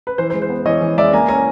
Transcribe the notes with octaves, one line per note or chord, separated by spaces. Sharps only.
B4
E3 C5
C5
G#3
C5
B3
E3 C#5 D#5
E3
G#3 D5 E5
A#3 G#5 A#5
C#4 G#5 A#5